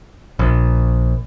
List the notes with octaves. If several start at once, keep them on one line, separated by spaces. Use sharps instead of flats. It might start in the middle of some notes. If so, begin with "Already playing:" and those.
A#1